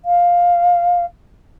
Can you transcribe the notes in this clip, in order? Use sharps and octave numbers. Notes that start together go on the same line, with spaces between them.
F5